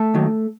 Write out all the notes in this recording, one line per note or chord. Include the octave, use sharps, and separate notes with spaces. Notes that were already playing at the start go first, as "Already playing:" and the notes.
Already playing: A3 A4
D#2 D#3 F#3